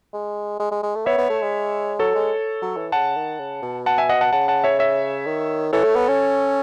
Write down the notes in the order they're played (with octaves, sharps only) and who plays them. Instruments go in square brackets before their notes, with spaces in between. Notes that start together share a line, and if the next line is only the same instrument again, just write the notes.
[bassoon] G#3
G#3
G#3
G#3
A3
[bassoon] B3 [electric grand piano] C#5 E5
[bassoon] B3
A3
G#3
[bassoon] F#3 [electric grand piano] A4 C#5
[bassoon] G#3
F#3
E3
[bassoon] C#3 [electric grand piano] F#5 A5
[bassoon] D#3
C#3
B2
[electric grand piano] F#5 A5
E5 G#5
D#5 F#5
F#5 A5
[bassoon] C#3 [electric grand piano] F#5 A5
[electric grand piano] F#5 A5
C#5 E5
C#5 E5
[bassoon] D#3
[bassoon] E3 [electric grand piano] A4 C#5
[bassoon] A3
B3
C#4